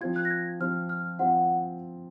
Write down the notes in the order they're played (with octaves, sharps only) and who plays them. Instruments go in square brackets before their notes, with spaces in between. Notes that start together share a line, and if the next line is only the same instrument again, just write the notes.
[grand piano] F3 C4 F4 [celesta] G#6
[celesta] F#6
A#6
G#6
[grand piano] F3 C4 F4 [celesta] F6
[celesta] F6
[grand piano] F3 C4 F4 [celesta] F#5